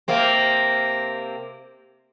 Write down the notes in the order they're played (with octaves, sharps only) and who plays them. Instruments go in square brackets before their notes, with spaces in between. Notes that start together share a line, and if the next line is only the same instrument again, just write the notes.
[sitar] C3 A#3 C4